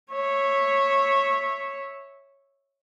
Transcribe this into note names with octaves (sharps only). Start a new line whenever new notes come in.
C#5 E5